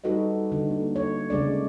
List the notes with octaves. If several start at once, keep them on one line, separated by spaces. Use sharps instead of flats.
G3 D#4 F#4 A4 B4 D#5
D3
A#3
C#5
C#3 G#3 D4 D5